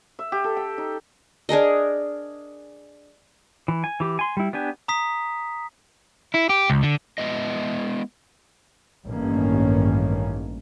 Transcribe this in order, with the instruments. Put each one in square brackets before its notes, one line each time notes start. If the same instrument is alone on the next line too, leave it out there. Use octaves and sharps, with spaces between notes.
[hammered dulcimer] E5
G4
A4
G5
D#4
[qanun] D4 G#4 A#4 D#5
[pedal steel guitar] E3
G#5
E3 G4
G#5 C6
G3 E4
B3 D4 G4 G#5
[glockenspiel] A#5 D#6 B6
[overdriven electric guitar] E4
G4
C#2
D3
[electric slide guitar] G#3 B3 E4 D#5
[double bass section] A1 G2 D#3 A#3 C#4